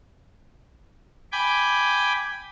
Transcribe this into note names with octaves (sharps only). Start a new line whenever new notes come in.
G5 G#5 B5 D6